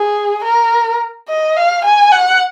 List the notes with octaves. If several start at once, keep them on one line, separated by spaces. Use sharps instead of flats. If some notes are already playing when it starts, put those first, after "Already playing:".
Already playing: G#4
A#4
D#5
F5
G#5
F#5